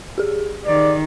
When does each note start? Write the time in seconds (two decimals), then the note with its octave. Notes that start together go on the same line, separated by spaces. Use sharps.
0.18 G4 G#4
0.66 D#3 D5